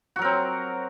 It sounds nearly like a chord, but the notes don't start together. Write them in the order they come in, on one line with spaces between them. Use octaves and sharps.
F#4 F#3 A#4 C4